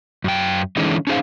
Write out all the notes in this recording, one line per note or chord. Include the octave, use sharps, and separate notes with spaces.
F#2 G5
D3 E3 G#3 C#4 D#4
C#4 D#4 G#4 C5 F5